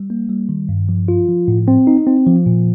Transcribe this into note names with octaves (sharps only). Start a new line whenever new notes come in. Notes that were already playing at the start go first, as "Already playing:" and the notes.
Already playing: G3
A#3
G3
D#3
G2
F3
F4
F3
A2
C4
D#4
C4
F3
A#2